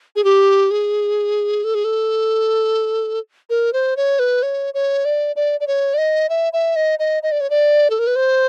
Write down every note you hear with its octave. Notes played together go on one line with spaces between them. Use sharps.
G#4
G4
G#4
A4
G#4
A4
A#4
C5
C#5
B4
C#5
C#5
D5
D5
D5
C#5
D5
D#5
E5
E5
D#5
D#5
D#5
D5
C#5
D5
A4
A#4
B4
C5